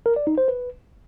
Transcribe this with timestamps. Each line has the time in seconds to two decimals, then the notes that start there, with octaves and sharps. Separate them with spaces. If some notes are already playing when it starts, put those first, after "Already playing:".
0.06 A#4
0.16 D5
0.27 D#4
0.38 C5
0.48 B4